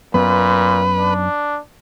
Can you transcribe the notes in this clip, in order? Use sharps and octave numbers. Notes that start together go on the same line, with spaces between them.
F#2 A#2 B3 B4
D4